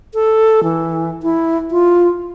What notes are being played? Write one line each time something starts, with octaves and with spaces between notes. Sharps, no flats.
A4
E3
E4
F4